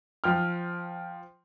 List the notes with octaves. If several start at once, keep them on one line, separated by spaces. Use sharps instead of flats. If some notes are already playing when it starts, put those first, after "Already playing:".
F3 G5 F6